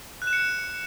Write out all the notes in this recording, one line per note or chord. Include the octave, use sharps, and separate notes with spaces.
F#6
E7
C#7